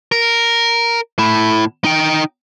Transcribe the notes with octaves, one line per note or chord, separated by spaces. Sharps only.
A#4
A2 E4
D#4 G5